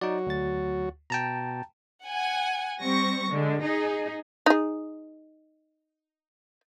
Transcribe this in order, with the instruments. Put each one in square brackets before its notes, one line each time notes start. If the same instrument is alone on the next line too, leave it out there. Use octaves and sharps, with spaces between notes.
[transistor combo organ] F#3 F#4 [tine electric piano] D#4 D5
[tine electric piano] D2 A6
[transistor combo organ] B2 [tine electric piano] G5 A5 A#5
[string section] F#5 G#5
G3 C4 C#6 A#6
D3 G#3
D#4 G#4
[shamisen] D#4 G#4